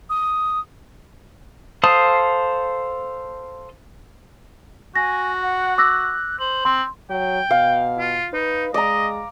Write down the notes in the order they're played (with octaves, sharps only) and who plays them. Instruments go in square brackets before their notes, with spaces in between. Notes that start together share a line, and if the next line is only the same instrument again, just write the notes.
[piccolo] D#6
[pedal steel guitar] A4 C5 F5 A5 D#6
[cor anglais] F#4 [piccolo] G#5 [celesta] A#6
[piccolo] F#5
[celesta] D6 E6 A#6 [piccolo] F#6
[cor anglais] C5 [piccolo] F#7
[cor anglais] C4 [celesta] C6
[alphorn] F#3 [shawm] G5
[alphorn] B2 [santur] F5
[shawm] F4
[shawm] D#4 [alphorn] B4
[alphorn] G#3 [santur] D5 A#5 [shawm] D#5